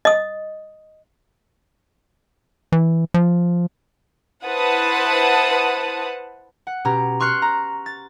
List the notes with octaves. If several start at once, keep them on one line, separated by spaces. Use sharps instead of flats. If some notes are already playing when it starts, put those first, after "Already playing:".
D#5 D#6
E3
F3
E4 B4 C5 F#5 A5 D#6
F#5
B2 C#4 G4 A#5
C6 C#6 F6 F#6 C7 C#7
A#5
A6